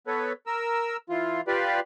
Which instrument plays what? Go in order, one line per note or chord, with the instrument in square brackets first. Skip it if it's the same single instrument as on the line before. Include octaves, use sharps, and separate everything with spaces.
[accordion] B3 A4 B4 C#5
A#4 E6
E3 F4
F4 G4 B4 D5